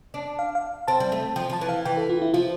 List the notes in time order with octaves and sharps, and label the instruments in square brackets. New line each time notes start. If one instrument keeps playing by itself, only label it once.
[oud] D4
[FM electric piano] F5
F5
[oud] C4 [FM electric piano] A5
[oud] G3
A3
[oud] F3 [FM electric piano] G5
[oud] F3 [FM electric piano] A5
[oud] E3
[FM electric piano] F5
[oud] E3 [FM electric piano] G5
[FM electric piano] A4
F4
E4
[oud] F3 [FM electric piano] F4